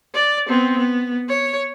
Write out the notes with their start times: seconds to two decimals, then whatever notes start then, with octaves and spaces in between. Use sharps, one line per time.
0.14 D5
0.48 B3 C4
0.78 B3
1.29 C#5